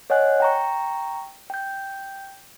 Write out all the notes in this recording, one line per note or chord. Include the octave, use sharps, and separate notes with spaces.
C#5 D#5 F#5 G#5 F#6
G5 A#5 C#6
G5 G6